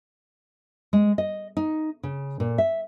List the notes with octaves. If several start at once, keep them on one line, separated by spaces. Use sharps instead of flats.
G#3
D#5
D#4
C#3
A#2
E5